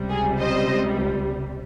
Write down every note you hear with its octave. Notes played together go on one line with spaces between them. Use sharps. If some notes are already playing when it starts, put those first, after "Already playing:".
Already playing: C#2 C3 G3
G#4
C5 D#5